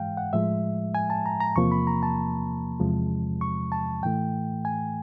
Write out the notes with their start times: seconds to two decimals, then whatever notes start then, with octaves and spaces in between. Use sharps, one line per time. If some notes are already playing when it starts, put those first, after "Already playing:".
Already playing: G#2 E3 G#3 F5 G5
0.17 F#5
0.33 A2 F3 G#3 E5
0.95 G#5
1.10 A5
1.26 A#5
1.40 A#5
1.56 E2 C3 F3 A#3 C#6
1.72 B5
1.87 A#5
2.03 A5
2.80 E2 C3 F3 G#3
3.41 C#6
3.72 A5
4.03 A2 E3 A3 G5
4.65 G#5